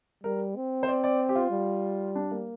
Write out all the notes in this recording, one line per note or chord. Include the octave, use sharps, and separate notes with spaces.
G3 A#4
C4
C5
D5
D5
G4
F4
G3
D4
A#3